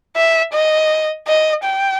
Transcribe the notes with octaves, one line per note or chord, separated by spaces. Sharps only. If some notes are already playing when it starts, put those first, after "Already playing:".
E5
D#5
D#5
G5